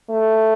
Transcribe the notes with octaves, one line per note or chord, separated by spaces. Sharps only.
A3